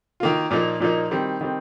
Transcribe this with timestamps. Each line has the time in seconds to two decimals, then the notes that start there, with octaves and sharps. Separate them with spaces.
0.20 D#3 A#3 F4
0.51 A#2 F3 A#3 D#4
0.80 A#2 F3 A#3 D#4
1.11 D#3 G3 C4
1.41 D#3 G3 C4